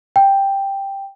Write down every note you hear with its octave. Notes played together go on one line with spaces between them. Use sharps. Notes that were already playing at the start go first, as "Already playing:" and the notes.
G5